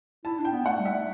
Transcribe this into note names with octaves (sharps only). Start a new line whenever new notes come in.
E4 A5
D4
G5
B3
A3 F#5
G3
E5
G3